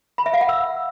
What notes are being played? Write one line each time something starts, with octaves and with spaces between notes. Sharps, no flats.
B5
E5
F5
F#5
E6